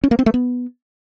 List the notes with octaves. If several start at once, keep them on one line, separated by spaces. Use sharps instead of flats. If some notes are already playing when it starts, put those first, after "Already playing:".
C#4
A#3
C4
A3
B3